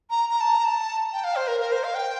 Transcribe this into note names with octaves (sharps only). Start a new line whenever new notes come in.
A#5
A#5
A5
A#5
A5
G5
F5
C5
A#4
A#4
C5
F5
G5